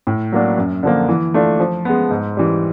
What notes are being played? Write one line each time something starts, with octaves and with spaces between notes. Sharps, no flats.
A2
F#3 A#3 D4
F#2
D3 F3 A#3
E3
A3 D4 F4
F3
G#3 B3
G#2
E3 G3